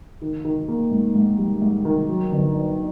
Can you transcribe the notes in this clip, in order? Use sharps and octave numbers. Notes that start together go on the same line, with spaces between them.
D#3
D#3
A#3
G#2
G#2
G3
G#2
D#3
F#3
G1
F#3